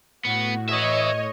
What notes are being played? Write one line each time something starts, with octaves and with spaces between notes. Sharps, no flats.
A2 B3 F#4
B4 C#5 D#5 E5